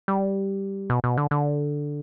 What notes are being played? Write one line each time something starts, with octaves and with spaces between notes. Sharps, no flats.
G3
B2
B2
D3
D3